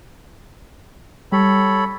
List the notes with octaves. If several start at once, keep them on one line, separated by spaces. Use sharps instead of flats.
G3 A4 C#5 B5